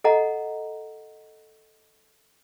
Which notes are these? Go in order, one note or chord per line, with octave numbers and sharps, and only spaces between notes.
A4 D#5 F#5 A#5